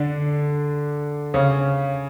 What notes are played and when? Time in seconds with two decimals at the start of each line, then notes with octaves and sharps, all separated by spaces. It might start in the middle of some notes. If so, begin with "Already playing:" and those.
Already playing: D3 D4
1.34 C#3 C#4